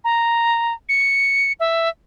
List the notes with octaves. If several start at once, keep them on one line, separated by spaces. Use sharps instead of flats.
A#5
C#7
E5